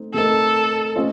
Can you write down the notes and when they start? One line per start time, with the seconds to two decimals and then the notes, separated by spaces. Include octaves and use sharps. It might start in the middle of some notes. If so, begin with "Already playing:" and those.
Already playing: A3 C4 D#4
0.14 A3 C4 D#4 A4 A#4 D#5
0.96 A3 C#4 F4 C5 D#5